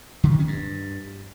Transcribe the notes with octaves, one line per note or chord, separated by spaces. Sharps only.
D3
D#3
C#4
G2